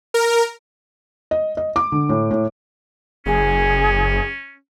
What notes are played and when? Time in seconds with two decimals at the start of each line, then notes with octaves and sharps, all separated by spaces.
0.14 A#4
1.31 D#5
1.57 D#5
1.76 D6
1.92 D3
2.09 A2
2.31 A2
3.26 F#1 C#4 G#4